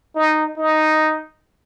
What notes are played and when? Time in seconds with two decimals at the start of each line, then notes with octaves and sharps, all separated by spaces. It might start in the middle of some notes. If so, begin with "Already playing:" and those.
0.16 D#4
0.57 D#4